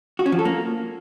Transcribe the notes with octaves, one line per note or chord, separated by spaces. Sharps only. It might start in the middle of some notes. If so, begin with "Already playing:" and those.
F#4
C#4
F3
A4
A#3